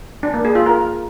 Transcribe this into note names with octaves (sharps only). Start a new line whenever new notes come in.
D4
A#3
G#4
F4
A#4